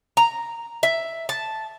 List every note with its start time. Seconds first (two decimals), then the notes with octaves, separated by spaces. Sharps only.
0.17 A#5
0.83 E5
1.29 A5